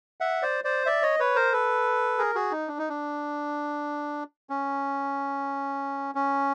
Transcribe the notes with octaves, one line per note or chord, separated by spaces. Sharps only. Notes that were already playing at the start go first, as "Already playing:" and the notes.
E5 F#5
C5 D5
C5 D5
D5 E5
C#5 D#5
B4 C#5
A#4 C5
A4 B4
G#4 A#4
F#4 G#4
D#4
D4
D#4
D4
C#4
C#4